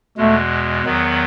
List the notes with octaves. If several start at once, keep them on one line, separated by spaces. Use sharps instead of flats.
E2 B2 G#3 A3
E2 D#3 F#3 B3